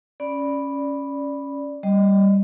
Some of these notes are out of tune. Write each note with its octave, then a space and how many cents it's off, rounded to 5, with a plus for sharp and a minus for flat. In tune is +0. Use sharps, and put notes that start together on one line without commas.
C#4 +0 D5 +0 B5 -5
G3 +0 D#5 +0